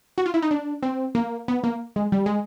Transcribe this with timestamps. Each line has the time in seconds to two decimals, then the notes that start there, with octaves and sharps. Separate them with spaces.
0.18 F#4
0.26 F4
0.34 E4
0.42 D#4
0.51 D4
0.83 C4
1.15 A#3
1.48 B3
1.64 A#3
1.96 G#3
2.12 G3
2.26 G#3